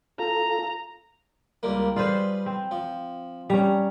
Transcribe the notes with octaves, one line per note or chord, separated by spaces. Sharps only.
F4 A4 A#5
C#2 G3 A#3
G3 F4 G#4 B4 C5
C4
F3
G3 C#4 A#5